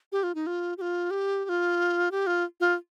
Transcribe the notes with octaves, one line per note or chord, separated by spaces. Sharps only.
G4
F4
D#4
F4
G4
F4
G4
G4
F4
G4
F4
F4